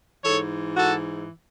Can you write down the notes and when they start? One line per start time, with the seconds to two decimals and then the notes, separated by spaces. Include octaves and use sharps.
0.22 G#2 E3 A4 C#5
0.76 F#4 A4